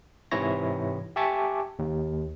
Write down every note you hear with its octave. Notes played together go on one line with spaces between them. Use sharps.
G#2 C3 E3 E4 C#5 A#6
G4 E5 G#5 A5 C#6 D6
D#2